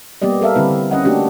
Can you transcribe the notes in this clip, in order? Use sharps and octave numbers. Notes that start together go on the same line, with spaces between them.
G3 A#3 B3 G4 D5 D#5
A4 A#4 E5 F5
D3 G3 C4 E4 B4
D3
C#4 D#5 F#5
A3 A#3 D4 F#4 G4